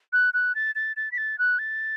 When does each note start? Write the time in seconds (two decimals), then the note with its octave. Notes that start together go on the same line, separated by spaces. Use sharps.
0.13 F#6
0.34 F#6
0.55 A6
0.75 A6
0.97 A6
1.12 B6
1.18 A6
1.38 F#6
1.59 A6